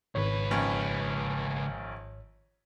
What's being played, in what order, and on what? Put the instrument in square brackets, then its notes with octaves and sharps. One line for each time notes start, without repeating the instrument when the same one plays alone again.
[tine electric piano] G#1 C#5 [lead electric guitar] C#2 B4
[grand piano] A#1 D#3 C#4